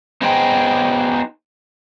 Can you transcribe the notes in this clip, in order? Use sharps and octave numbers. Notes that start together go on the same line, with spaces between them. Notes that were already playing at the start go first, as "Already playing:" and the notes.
B3 D#4 G#4 C5 G5